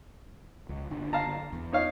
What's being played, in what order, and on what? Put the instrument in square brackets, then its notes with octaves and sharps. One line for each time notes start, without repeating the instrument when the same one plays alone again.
[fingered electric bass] C#2
F#1 D3 D4
[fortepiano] F5 A5 A#5
[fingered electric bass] E2
[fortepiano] D#4 C#5 F5